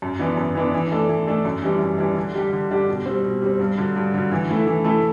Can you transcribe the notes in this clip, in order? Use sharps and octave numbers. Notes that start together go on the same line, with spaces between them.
F#2
E3 B3 D4
F#2
E3 B3 D4
E3
A3 D4 A4
E3
A3 D4 A4
F#2
E3 G3 D4
F#2
E3 G3 D4
D3
G3 D4 G4
D3
G3 D4 G4
B2
G3 C4
B2
G3 C4
G2
D3 F#3
G2
D3 F#3
E3
A3 E4 A4
E3
A3 E4 A4